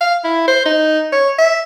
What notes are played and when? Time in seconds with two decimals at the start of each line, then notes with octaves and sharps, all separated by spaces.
0.01 F5
0.24 E4
0.48 C5
0.66 D#4
1.12 C#5
1.39 E5